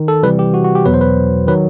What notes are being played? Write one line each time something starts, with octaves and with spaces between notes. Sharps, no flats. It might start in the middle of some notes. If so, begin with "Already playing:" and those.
Already playing: D#3
A4
C3 E3 G3 B4
G4
F#4
F#4
G4
E2 B2 F#3 B4
C5
B4
D#3 F#3 B4